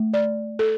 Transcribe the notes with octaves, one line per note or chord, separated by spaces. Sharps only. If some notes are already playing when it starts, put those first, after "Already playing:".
Already playing: A3
D5
A4